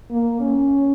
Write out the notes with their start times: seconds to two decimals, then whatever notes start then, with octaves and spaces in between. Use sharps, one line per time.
0.10 A#3
0.40 C#4